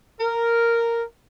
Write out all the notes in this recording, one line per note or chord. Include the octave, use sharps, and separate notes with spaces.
A#4